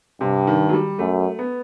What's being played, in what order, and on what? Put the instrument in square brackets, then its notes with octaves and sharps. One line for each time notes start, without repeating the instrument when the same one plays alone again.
[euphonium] G2 [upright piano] C3
[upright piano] D#3
F#3
G3
[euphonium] F#2 [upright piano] A3
[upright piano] B3